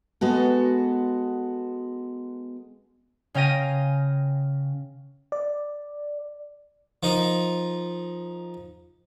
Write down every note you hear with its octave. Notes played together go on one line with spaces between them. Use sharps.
G#3 B3 F#4 A4
C#3 C#4 F5 G5 A#6 D#7
D5
F3 D#4 A#4